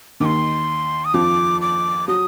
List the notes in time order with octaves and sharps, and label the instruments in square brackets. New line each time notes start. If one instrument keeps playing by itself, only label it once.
[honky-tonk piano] D#2 D#3 [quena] C6 D6
[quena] D#6
[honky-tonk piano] F2 F3 [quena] D6
[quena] D6
[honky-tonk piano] F#3 [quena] D#6